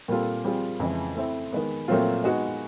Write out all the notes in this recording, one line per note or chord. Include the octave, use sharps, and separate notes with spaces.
A#2 G3 C4 F4 A4
G3 C4 F4 G#4
F2 C#3 E3 G#3
A3 C4 E4
D#3 G#3 B3
A#2 F#3 A3 C4 F4
G#3 B3 D#4 F#4